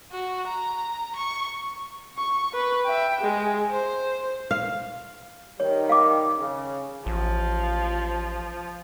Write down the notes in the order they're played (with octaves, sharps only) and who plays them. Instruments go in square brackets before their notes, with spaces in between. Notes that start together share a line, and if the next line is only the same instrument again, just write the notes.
[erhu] F#4
A#5
C#6
[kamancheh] C#6
B4
E5 G5
G#3
C5
[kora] F5
[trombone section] D#3 G3 [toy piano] C#5
[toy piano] F5 D6
[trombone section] C#3
[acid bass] A1 [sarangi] F3